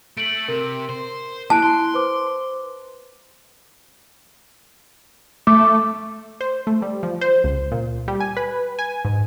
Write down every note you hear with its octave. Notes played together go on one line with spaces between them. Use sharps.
A3 D7 F#7
C3 A#4
C5
A#3 E4 A5 F#6 D7
C6
B4 C5 D6
A3 D6
C5
A3
G3
F3
C5
C#2
A#2
G3
G#5
B4
G#5
G#2